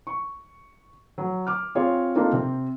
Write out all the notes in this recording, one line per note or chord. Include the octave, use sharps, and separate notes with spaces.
C#6
F#3
D6 F6
C4 F4 G#4 C#5 D5
A#3 C4 D4 D#4 F4 A4
C3 C4